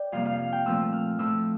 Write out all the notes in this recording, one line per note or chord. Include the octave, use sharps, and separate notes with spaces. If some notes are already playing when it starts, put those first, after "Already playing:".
Already playing: A#4 D5 G5
F2 C3 G3 A#3 F5
F5
F5
G5
A#2 F3 A3 C4 E6
F6
A2 F3 A3 E6